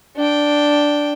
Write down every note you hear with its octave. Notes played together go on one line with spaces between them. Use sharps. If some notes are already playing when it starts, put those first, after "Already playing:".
D4 G5